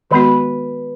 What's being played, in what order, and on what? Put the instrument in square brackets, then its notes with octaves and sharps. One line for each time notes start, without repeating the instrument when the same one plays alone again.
[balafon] D#3 G#3 B3 F#4 [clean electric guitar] B4